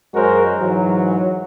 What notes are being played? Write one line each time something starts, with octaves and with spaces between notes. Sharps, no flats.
F#2 G#3 F#4 A#4 C5
G#2 E3 F#3